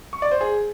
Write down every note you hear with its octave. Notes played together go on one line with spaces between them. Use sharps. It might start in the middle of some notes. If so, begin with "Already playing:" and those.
C#6
D5
C5
G#4